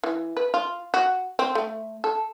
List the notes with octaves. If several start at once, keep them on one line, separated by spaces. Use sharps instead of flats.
E3
B4
F4
F#4
C4
A3
A4